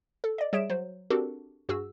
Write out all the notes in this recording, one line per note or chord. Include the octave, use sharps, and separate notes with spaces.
A4
D5 D#5
G3 G#4 C#5 E5 D7 E7
F#3 C5
C4 D4 F#4 G4 A4 A#4
G2 F#4 G#4 E6